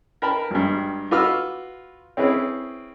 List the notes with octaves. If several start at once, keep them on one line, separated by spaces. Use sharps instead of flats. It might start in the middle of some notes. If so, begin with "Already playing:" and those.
A#4 B4 G5 A5 B5
G#1 G2
F4 F#4 B4 D6 E6 F6
C4 C#4 E4 G#4 B4